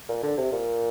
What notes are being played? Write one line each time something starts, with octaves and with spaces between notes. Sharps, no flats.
A#2
D3
C3
A#2